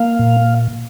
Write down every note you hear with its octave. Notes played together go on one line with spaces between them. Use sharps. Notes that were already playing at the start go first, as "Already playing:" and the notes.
Already playing: A#3 F5
A#2